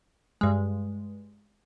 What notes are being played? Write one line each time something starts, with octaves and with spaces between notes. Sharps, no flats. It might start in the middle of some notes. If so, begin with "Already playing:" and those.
G2 G#3